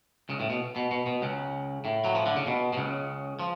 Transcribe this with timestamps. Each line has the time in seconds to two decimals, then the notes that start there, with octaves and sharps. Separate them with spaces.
0.29 C#2 C#3
0.40 A2
0.50 B2
0.76 B2
0.91 B2
1.06 B2
1.22 C#2 C#3
1.85 A2
2.04 F#3
2.15 F3
2.26 D3
2.36 C#3
2.47 B2
2.73 B2
2.78 C#2 C#3
3.39 F3